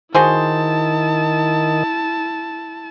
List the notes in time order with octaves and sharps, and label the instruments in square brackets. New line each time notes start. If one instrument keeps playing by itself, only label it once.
[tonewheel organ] D#3 [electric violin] E4 A5 [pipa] F#4 G#4 C5